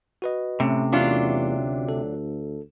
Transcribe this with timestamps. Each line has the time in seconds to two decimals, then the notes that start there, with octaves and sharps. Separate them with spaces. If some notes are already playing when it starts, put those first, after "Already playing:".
0.22 F#4 B4 D#5
0.60 A2 C3 A3 C#4
0.92 E2 F#3 D4 F4
1.59 D2
1.89 A4